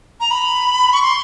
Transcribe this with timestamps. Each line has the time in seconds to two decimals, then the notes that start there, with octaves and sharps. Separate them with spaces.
0.20 A#5
0.31 B5
0.93 C#6
1.02 C6